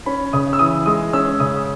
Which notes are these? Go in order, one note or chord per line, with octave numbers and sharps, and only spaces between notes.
C#4 B5
C#3 D#6
E6
E3 D#6
G#3 D#6
C#4 E6
C#3 D#6
D#6